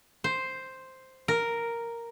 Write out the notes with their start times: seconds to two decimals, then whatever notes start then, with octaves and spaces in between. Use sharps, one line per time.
0.24 C5
1.28 A#4